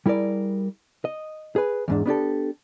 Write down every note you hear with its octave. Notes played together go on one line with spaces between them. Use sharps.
G3 E4 G#4 A#4 D5
D#5
G#4 B4
E2 G#2 D4
B3 D4 G4 A4